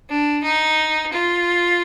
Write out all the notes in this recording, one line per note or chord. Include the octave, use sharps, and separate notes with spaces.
D4
D#4
F4